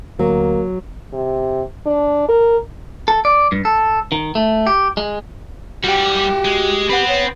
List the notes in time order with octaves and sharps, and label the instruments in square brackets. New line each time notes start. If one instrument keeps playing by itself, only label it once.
[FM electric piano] D2 [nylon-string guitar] F#3 [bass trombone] A#3
[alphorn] C3
D4
A#4
[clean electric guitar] A4
D5
G2
A4
D#3
A3
G4
G#3
[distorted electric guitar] G3 [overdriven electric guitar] F#4 G5 [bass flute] G4
[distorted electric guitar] G#3
[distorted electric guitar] C4 [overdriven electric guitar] B4 F#5
[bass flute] C#5